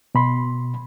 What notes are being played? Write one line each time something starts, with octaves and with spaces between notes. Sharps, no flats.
B2 B5 C6